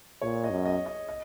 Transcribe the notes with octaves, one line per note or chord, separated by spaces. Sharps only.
A#2 C#5
D#5
F#2
D#5
D#5
D#5